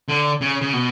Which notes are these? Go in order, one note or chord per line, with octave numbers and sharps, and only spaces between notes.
D3
C#3
C#3
B2